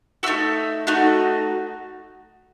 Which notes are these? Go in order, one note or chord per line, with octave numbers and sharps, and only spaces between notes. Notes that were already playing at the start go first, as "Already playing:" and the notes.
A3 D#4 F#4 E5 E6
A3 D#4 F#4